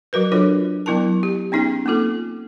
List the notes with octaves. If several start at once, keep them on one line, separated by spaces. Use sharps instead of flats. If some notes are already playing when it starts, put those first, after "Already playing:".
F#3 F#4 A#4 B4
D4 F4 A4 A#4 C#5 D#5
F#3 B3 E4 A#4 A5
G4
B3 C#4 D#4 G#4 G5
A#3 C4 F4 A4